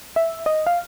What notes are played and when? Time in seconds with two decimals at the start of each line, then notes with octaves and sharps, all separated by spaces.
0.16 E5
0.46 D#5
0.67 F5